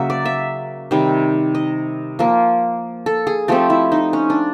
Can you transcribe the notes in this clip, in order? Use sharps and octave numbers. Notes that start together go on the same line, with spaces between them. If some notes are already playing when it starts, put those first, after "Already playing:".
Already playing: C#3 F#3 A#3 E5
D5
E5
C3 D#3 G3
D#5
F3 A#3
A4
G#4
F3 A3 C4 G4
E4
D#4
C#4
D4